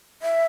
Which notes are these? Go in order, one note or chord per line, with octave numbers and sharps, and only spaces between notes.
E5